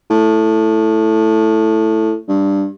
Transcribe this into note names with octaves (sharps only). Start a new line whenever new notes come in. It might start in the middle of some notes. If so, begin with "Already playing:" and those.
A2
G2